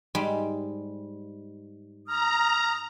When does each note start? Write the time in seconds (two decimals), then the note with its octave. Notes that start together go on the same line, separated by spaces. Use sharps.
0.15 G#2 G3 G#3
2.07 A#5 D#6 F6